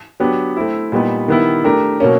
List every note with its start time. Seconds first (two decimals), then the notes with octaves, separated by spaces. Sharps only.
0.20 F#3 B3 D4 G4
0.57 A3 C4 E4
0.92 A#2 G3 B3 D#4
1.28 D#3 G3 B3 E4
1.64 A3 D4 G4 A#4
2.00 B2 F#3 A#3 C#4